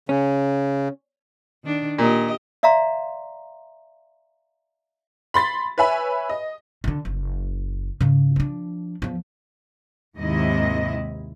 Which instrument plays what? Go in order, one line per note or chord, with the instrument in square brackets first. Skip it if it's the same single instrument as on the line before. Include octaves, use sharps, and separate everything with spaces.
[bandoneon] C#3 [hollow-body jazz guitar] C#4
[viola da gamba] D#3 D4
[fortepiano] A#2 [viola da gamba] G4 D#5
[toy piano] D5 E5 F5 A#5 C6
[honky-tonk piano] B5 C6 A6 B6
B4 C#5 E5 G#5 B5
D#5
[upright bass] D3 D#3
F#1
G#2 C#3
F3 D4
E2 F3
[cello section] D#2 G#2 C3 D#3 E4 D#5